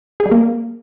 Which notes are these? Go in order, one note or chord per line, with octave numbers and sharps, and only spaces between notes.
G#4
G3
A#3